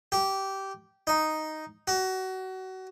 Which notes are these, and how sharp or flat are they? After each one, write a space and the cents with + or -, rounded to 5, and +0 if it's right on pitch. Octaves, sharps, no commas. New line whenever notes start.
G4 -15
D#4 +0
F#4 +25